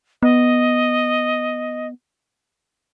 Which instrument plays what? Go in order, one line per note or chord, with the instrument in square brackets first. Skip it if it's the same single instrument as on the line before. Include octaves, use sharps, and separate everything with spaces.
[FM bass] B3 [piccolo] D#5